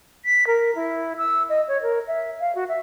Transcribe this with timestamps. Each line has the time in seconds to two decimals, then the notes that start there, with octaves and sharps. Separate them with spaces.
0.25 B6
0.47 A#4
0.75 E4
1.18 E6
1.49 D#5
1.68 C#5
1.82 A#4
2.07 E5
2.40 F5
2.55 F#4
2.68 E5